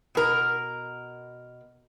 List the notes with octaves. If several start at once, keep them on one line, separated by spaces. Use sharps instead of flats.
B2 A#4